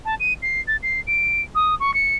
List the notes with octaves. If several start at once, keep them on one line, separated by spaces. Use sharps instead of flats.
A5
D#7
C7
A6
C7
D7
D#6
C#6
C#7